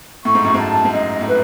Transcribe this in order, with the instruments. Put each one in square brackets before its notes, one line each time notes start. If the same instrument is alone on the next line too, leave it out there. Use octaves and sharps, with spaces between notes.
[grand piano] A2 [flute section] C#6
[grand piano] G#2
F#2
[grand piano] G#2 [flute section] A5
[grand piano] G#2
[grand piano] F#2 [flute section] D#5
[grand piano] A2
[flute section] B4